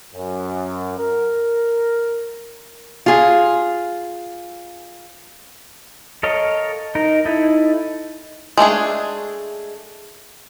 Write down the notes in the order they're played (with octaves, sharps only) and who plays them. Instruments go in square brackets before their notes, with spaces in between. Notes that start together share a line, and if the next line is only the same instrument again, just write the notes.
[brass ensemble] F#2
A#4
[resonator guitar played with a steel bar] F4 G#4
[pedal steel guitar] A4 A#4 C#5 D#5 F5
D#4 A#4
D#4 E4 A4
[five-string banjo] G#3 A3 D4 G#4